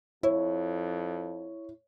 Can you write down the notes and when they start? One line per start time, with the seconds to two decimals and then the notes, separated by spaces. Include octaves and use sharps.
0.23 F2 E4 C#5